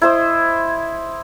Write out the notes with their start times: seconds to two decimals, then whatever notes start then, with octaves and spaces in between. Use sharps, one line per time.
0.02 E4 C5 D#5